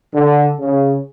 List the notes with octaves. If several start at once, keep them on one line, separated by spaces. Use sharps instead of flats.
D3
C#3